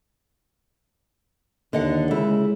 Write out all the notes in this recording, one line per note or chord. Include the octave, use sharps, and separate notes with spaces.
D#2 D3 D#5 F#5
C#3 G#3 E4